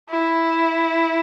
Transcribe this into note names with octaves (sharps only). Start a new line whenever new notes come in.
E4